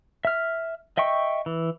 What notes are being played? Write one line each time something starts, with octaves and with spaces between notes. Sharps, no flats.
E5 F6
D#5 E5 G5 C#6
E3